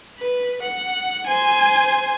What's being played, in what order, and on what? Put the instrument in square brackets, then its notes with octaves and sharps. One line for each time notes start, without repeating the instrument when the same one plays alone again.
[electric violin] B4
F#5
C5 G#5